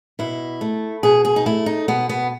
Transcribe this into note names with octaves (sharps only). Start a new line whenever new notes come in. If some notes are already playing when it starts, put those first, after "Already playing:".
B2 E4
A3
B2 G#4
G#4
D#4
A3 E4
D#4
B2 B3
B3